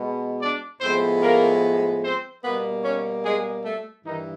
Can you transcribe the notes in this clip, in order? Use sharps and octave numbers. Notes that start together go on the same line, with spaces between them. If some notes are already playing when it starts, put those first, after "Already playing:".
Already playing: B2 G#3 B3
D4 D5
A2 F3 G#3 B3 C4 C5
A#3 A#4
C4 C5
B2 G3 A#3 B3 B4
C#4 C#5
G#3 G#4
A3 A4
G2 D#3 E3 D#4